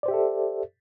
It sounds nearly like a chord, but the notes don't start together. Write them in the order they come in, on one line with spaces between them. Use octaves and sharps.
D5 C5 G4 E5 A4